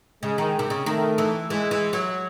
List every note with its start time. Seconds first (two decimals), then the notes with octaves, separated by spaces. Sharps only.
0.23 C#3 G#3
0.38 D#3
0.59 C3
0.70 C#3
0.86 D#3 A3
1.18 E3
1.50 E3 G#3
1.71 E3
1.93 F#3